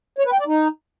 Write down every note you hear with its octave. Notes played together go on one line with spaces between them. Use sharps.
C#5
B4
G5
D5
D#4